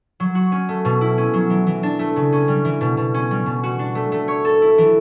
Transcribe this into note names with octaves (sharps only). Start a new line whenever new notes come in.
F#3
F#4
C#4
A3
B2
E4
C#4
F#3
E3
E3
D4
A3
C#3
C#4
G3
E3
B2
B2
C#4
G3
B2
F#4
D4
A3
A3
C#5
A4
E4
E3